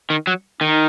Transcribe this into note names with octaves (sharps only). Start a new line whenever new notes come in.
D#3
F#3
D#3 D#4